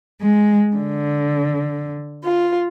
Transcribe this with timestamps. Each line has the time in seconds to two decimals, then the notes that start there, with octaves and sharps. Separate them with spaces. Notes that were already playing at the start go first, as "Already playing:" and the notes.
0.21 G#3
0.77 D3
2.24 F4